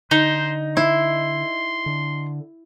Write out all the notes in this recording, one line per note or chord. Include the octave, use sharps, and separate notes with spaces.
D3 D#4 C5
E4 C6
D3